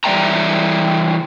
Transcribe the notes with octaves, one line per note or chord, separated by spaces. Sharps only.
E3 G3 D5 E5 G5 A#5